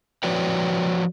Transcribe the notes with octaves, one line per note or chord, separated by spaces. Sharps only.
F3 F#4 B4 C#5 D5 G5